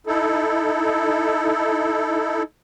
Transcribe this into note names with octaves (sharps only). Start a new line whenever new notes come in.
D#4 E4 A4